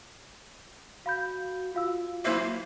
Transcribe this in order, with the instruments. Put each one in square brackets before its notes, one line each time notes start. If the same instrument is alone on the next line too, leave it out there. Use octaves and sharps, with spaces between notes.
[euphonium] F#4 [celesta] F5 B5 G6
[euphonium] F4 [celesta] F#4 F5 E6
[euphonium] F#3 [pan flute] A#3 [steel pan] E4 C5 E5